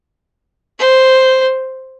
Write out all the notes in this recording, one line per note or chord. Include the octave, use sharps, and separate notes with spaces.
C5